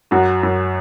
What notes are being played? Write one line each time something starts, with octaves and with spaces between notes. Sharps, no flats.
F#2 F#4
F#2